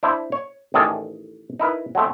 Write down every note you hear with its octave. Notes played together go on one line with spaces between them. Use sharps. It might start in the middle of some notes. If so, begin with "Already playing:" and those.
D4 E4 C5
C#5
A1 A2 D#3 G#4 A4 D5
D#4 E4 A#4 B4
F#3 G#3 A3 C4